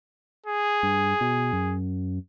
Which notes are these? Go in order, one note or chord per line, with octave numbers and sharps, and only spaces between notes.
G#4
G2
B2
F#2